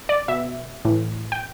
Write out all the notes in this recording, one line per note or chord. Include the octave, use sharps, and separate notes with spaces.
D5
B2 E5
A2 E3
G5